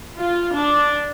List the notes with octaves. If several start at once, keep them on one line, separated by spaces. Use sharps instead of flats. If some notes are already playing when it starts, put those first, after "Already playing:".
F4
D4